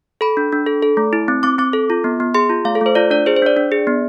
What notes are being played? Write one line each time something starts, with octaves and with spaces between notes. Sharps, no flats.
A4 B5
D4
D4
A4
A4
A3
E4
C4
C4 D6
C4 D6
A4
F4
B3
B3
G#4 C6
F4
A3 F5
A4
A3 C5
F4 D5
D4 D5
G#4 C5
C5
D4 D5
D4
G#4
B3